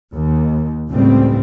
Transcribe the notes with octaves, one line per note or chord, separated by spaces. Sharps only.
D#2
C#2 A2 G3 C4